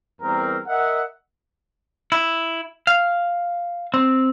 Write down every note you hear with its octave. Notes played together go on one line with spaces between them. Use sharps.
E2 G3 C4 A#4
A#4 D#5 E5 F#5
E4
F5
C4